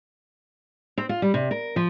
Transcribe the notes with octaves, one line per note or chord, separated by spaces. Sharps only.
C4
F4
G3
C3
A#4
F3